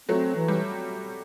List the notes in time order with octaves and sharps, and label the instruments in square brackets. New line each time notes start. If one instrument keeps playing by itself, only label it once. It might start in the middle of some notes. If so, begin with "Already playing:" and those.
[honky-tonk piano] F#3 A3 [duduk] C4
[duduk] E3
[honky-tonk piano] G3